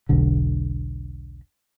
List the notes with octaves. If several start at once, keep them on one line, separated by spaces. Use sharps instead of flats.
E1 B1 D3